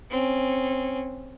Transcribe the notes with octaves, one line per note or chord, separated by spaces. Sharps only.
C4 C#4